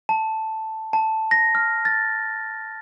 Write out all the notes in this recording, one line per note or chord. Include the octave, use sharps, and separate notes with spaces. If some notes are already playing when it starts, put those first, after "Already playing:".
A5
A5
A#6
F6
A6